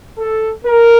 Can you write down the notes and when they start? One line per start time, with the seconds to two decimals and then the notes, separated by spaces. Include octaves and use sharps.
0.18 A4
0.65 A#4